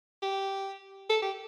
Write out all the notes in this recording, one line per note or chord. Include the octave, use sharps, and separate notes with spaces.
G4
A4
G4